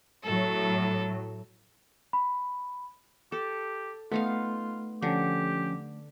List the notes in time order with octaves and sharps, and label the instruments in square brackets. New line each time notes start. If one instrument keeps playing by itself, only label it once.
[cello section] A2 F#3 [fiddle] A4
[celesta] B5
[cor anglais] G4 [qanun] A4
[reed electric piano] A3 [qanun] B3 D#4 F5 [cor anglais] F4
[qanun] D3 [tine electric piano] F3 C#4 [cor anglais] G4